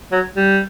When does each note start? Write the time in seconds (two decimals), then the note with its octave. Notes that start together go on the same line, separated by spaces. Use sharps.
0.12 F#3
0.36 G3